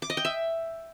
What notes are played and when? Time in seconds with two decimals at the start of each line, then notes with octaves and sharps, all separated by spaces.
0.02 D6
0.10 D#5
0.17 G5
0.25 E5